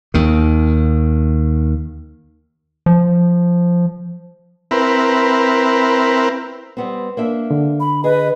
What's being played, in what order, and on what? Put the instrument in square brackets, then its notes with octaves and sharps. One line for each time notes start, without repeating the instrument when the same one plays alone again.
[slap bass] D#2 D#3
[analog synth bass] F3
[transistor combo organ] C4 E4 A#4 B4
[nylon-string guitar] G3 B3 C4
A#3 D4 E5
[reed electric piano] D3
[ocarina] B5
[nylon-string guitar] G#4 [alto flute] B4 [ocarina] D#5